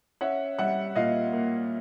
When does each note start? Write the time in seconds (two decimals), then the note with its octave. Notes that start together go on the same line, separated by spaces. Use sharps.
0.21 C#4 E5 F#5
0.59 G3 E5 F#5
0.96 A#2 D#5 F5
1.33 A#3